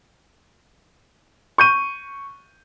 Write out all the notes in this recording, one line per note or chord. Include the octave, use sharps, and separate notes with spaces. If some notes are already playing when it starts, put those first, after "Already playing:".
C#6 G6 D#7